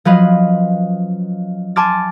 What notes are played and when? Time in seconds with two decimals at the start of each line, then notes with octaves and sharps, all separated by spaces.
0.05 F3 F#3 C#4 B4 D#5 F5
1.76 G#5 A5 C6 D6 F6 A6